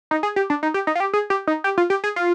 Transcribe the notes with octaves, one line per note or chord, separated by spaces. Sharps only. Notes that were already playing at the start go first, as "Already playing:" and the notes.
D#4
G#4
G4
D4
D#4
G4
D#4
F4
G4
G#4
G4
D#4
G4
F4
G4
G#4
F4